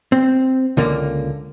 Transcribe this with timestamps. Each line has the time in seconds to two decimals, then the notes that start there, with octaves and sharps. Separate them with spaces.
0.12 C4
0.77 C#2 D3 A#3